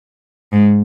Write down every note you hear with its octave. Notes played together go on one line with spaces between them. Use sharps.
G#2